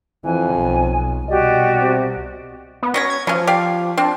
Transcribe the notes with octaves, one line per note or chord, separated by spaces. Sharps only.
F2 E3 G#5
B1
C2 B2 F#4 G4 D5 D#5
C3
B3
F#3 C#4 C#5 A#6
G#6
F3 F#3 C#4
G4 D5 F5
C4 D4